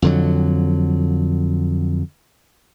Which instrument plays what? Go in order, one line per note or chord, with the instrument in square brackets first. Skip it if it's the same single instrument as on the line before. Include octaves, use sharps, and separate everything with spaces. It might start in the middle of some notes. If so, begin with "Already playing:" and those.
[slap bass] F2 D3 F#3